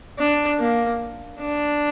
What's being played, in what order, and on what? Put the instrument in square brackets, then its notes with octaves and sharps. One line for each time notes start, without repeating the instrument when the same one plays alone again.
[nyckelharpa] D4
A#3
D4